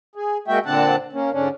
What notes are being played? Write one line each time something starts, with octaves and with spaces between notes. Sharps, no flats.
G#4
G#3 A#3 F#4 E5 G5
A#2 D3 C4 D4 F#5 A5
A#3 C#4
G#2 D3 C#4 D4